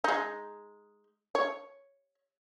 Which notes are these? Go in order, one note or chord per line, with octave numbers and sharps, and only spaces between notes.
G#3 D#4
C#5